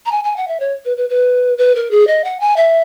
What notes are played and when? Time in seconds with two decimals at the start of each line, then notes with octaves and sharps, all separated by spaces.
0.06 A#5
0.11 G#5
0.24 G#5
0.36 F#5
0.48 E5
0.60 C#5
0.85 B4
0.97 B4
1.09 B4
1.58 B4
1.75 A#4
1.91 G#4
2.07 D#5
2.24 F#5
2.40 G#5
2.56 E5